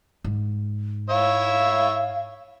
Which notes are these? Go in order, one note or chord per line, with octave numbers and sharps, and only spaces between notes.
G#2
E4 C#5 E5 F5